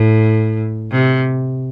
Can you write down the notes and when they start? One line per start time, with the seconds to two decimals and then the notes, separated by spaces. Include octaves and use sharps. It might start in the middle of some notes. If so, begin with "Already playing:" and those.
Already playing: A2
0.92 C3